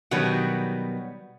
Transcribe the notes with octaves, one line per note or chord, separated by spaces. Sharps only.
B2 D#3 F#3 G3 B3